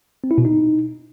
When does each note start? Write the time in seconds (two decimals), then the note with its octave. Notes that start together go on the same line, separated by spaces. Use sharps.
0.24 C4
0.31 E4
0.38 B2
0.45 D#4